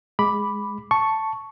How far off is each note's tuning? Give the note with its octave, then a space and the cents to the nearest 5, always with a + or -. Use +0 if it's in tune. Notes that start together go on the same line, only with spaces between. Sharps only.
G#3 +0 B5 +0 D6 +0
A5 +0 C#6 +0